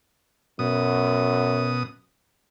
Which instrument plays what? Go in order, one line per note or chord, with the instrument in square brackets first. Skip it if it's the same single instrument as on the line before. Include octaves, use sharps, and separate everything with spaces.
[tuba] F#2 [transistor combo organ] B2 D#6